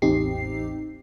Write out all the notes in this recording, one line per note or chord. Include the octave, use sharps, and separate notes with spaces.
A1 E2 C4 D#4 G4 C7